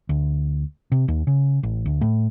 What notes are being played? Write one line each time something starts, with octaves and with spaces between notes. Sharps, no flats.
D2
C3
D#2
C#3
A1
D2
A2